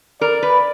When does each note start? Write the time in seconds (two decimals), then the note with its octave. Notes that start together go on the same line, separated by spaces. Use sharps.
0.21 A#4 D5
0.43 B4